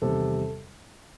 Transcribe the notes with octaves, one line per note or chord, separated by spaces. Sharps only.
E2 C3 D#3 G3 A4